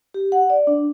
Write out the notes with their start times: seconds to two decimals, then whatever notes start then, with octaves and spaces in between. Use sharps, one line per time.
0.14 G4
0.32 F#5
0.50 D5
0.67 D4